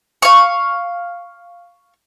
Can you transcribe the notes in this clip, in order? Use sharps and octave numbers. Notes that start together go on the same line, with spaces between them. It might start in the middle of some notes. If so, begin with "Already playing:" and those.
F5 C#6